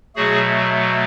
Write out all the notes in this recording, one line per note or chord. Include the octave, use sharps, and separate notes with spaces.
B2 F#3 A3 F#4 G#4